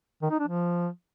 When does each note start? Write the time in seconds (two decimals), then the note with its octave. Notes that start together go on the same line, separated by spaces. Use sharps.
0.22 D#3
0.31 D#4
0.39 D4
0.48 F3